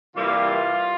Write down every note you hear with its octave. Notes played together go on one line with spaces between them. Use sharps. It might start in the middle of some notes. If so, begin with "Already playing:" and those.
C3 E3 G3 A#3 F4